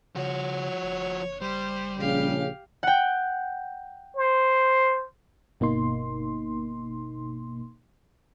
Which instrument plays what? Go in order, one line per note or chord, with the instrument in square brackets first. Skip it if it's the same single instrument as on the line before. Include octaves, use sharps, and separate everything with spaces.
[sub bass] C#3 [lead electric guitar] F3 F#4 [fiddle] C#5
[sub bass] F#1
[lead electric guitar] G3 [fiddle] C5
[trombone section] A#1 C#3 [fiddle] G4 F5
[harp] F#5 G5
[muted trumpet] C5
[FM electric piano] G1 B2 A#3 D#4 C6